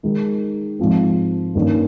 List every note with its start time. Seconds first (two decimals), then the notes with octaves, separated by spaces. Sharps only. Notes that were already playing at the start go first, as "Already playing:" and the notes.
0.03 D#3 G#3 D#4
0.79 G#2 F3 C4
1.55 G2 D#3 A#3 C#4